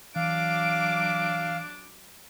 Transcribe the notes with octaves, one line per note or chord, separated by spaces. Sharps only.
E3 F#3 D4 F5 D6